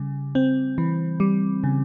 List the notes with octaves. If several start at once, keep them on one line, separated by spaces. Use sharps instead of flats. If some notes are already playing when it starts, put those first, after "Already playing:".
Already playing: C#3 G3
C4
E3
G3
C#3